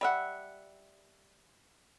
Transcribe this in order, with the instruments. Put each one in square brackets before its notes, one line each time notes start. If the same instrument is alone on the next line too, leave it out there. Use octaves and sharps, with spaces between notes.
[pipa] G3 E5 F#5